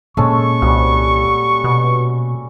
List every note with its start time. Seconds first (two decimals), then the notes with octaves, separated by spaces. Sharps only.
0.17 A#2 G#3 C#4 A4 C#6
0.62 C2 G3 F#4
1.64 B2